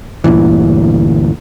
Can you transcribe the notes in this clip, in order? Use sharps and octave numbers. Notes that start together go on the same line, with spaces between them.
G1 D2 A#2 E3